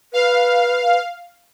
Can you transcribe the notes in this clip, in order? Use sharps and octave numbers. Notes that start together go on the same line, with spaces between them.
B4 F5